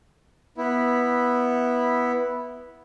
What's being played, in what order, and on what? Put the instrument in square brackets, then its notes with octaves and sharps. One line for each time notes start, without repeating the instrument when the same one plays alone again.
[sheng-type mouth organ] B3 E4